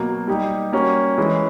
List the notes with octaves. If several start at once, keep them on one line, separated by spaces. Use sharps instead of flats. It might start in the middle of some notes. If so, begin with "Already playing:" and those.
Already playing: B2 F#3 A#3
G3 A#3 D#4 G4
G3 A#3 C#4 F#4
E3 G#3 C#4